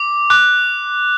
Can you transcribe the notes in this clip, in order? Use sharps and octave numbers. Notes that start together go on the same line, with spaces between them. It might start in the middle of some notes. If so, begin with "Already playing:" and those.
Already playing: D6
D6 F#6